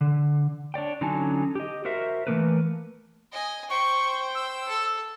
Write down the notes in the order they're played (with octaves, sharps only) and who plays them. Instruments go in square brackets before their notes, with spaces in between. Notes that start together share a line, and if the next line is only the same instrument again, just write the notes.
[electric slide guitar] D3
D4 C#5 D5 G5
D3 F#3 C#4 D#4 G#5 A5
G4 D#5
F#4 A#4 C5 E5
E3 F3 A3 A#3 A#4 B4
[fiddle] D#5 G#5
[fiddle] C5 G5 [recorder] C#6
[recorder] E6
[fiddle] A4